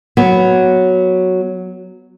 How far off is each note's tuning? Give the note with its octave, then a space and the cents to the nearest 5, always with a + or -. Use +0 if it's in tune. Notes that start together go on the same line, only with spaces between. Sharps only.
F#3 +0 B3 +0